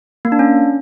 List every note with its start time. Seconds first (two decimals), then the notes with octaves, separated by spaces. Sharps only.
0.25 A#3
0.32 D4
0.39 C#4